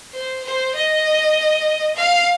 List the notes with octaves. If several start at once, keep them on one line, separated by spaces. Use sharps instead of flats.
C5
C5
D#5
F5